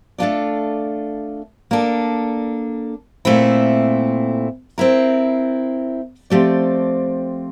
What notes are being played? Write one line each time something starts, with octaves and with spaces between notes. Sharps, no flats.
A3 D4 F4 A4 D5
A#3 D4 A4
A#2 A3 C4 E4
C4 E4 A#4
F3 A3 C4 G4 D5